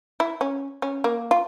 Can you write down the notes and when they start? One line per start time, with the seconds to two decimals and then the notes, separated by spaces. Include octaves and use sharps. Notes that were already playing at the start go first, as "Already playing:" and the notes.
0.20 E4
0.41 C#4
0.82 C#4
1.04 A#3
1.31 F4